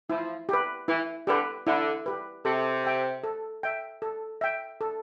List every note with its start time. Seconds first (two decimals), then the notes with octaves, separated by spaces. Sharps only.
0.10 F3 E4
0.49 G4 B4
0.88 E3 E4
1.27 D3 G4 B4
1.67 D3 E4
2.06 G4 B4
2.45 C3 A4
2.84 E5 G5
3.24 A4
3.63 E5 G5
4.02 A4
4.41 E5 G5
4.81 A4